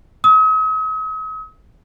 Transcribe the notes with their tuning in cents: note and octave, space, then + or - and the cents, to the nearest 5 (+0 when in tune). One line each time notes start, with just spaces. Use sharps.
D#6 +45